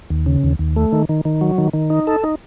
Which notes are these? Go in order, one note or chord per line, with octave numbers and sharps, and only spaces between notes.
D#2
C#3
D#2
D#2
A3
D#3
D#3
D#3
F#3
D#3
D#3
D#4
A4
D#4